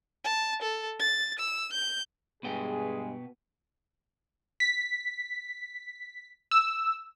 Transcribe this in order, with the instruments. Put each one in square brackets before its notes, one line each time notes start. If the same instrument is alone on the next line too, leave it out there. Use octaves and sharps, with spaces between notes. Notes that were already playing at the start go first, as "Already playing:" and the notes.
[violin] A5
A4
A6
E6
G6
[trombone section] G2 G#3 G#4 [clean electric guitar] B2 B3 G5
[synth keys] B6
E6